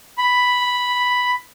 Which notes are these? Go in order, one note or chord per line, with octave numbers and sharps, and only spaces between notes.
B5